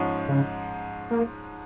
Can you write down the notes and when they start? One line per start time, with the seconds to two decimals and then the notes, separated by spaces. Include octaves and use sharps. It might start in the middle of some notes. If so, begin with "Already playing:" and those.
Already playing: G#2 F3 G#3 C#4
0.28 C#3
1.11 A#3